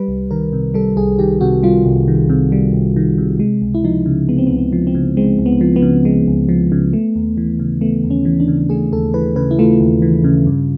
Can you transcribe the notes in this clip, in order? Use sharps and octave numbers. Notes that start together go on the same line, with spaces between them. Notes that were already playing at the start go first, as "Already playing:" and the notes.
Already playing: G3 B4
C2
D#3 A#4
C3
G3 A4
C2 G#4
D#3 G4
C3 F#4
G3 F4
C2
D#3
C3
G3
C2
D#3
C3
G#3
C#2
E4
F3 D#4
C#3
G#3 B3
C4
C#2 B3
C4
F3
C4
C#3
G#3 C4
C#2
B3
F3
B3
C#3
G#3
C#2
F3
C#3
A3
D#2
E3
C#3
A3 B3
D#2
C#4
E3
D4
C#3
A3 G#4
D#2 A4
E3 B4
C#3 B4
E4
A3 F4
D#2
E3
C#3
G2